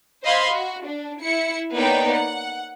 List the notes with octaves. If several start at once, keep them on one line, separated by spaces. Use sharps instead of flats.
C5 D#5 F5 B5 C6 G#6
F#4
D4
E4 C#7
A#3 B3 D#4 C#5 D5 G5
F#5